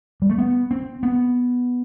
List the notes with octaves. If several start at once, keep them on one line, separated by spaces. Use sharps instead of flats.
G3
A3
B3
C4
B3